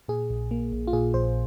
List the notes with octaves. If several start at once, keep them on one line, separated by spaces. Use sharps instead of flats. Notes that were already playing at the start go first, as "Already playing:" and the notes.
A#2 G#4
A#1
A#3
A#1
F4
A#2 G#4
A#1 C5